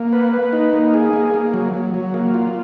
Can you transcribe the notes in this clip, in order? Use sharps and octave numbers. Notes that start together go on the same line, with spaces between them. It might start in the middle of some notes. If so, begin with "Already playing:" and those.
Already playing: A#3
B4
B4
D#4
A#3
G#4
A#3
A#3
F#3
F#3
F#3
A#3
F4